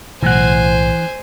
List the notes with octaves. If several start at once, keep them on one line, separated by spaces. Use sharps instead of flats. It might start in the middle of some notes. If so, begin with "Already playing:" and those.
B1 A2 E3 C5 F#5 G#5